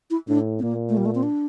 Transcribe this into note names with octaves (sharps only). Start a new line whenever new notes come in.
E4
A2 D4
C4
A#2 A#3
A3
G3
A3
C4
D4